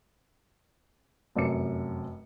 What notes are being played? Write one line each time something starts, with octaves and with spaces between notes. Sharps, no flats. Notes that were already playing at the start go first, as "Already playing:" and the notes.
F1 F#2 D6 C#7